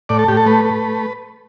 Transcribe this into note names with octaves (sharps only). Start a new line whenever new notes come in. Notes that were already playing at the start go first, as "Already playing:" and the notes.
A2 D5
A4
A2 G4
A4
A3 B4
A3